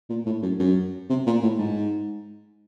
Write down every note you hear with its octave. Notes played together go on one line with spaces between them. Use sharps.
A#2
A2
F#2
F#2
C3
A#2
A2
G#2